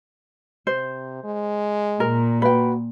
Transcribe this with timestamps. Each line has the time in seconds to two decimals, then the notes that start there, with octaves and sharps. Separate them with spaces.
0.67 C3 C5
1.24 G#3
2.00 A#2 A#4
2.42 F#4 B4 G5